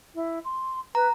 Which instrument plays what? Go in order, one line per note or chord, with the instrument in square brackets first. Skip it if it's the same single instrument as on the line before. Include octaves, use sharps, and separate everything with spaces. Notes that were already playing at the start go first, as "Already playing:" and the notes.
[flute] E4
C6
[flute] B4 [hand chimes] A#5